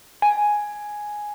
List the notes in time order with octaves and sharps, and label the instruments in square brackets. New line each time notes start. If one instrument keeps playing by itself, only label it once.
[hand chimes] G#5